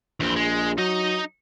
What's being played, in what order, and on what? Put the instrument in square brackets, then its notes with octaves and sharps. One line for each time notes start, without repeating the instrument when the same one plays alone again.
[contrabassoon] A#1 [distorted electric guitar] E2 C4
[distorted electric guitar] G#3
[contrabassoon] F#3 [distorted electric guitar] D#4 D#5